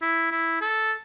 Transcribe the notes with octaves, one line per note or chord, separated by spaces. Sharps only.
E4
E4
A4